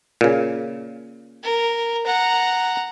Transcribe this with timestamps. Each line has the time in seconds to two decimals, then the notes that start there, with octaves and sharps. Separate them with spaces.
0.21 A#2 C#3
1.43 A#4
2.06 F#5 A#5